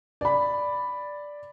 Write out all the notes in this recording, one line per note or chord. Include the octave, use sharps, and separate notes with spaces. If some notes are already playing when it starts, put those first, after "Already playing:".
D5 B5